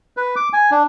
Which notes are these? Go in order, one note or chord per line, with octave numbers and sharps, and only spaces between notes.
B4
D6
G#5
D4